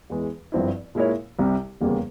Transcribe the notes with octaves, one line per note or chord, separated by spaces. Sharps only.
E2 E3 G#3
G#1 G2 F3 C4 E4
A#2 G#3 E4 A#4 C#5
C2 C3 G3
F1 E2 C#3 G3 A#3